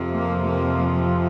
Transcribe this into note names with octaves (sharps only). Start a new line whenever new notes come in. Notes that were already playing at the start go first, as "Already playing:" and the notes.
Already playing: F2 C3 F3
A#3
A#3